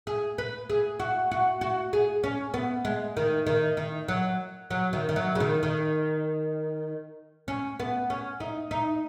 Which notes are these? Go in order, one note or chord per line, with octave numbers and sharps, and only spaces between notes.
G#4
B4
G#4
F#4
F#4
F#4
G#4
C#4
B3
G#3
D#3
D#3
D#3
F#3
F#3
D#3
D#3
F#3
C#3
D#3
D#3
C#4
B3
C#4
D#4
D#4